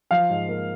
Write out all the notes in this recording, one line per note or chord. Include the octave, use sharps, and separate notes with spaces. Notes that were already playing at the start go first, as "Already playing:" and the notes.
F3 F5
G#2
A#3